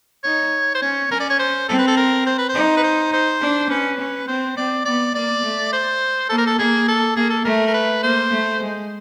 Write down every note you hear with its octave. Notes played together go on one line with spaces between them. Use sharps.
D#4 C#5
C5
C#4 C#5
C#4 A#4
D5
C#5
C5
C4 A4
B4
A4
A#4
C5
B4
C5
D#4
B4
C5
C5
D4
C#4 B4
C#4
C4 C5
C4 D5
B3 D5
A#3 D5
A3
C5
A#3 A4
A#4
A4
A#3 G#4
A4
A#3 G#4
A4
A3 A#4
A#4
B4
A#3 C5
A3
G#3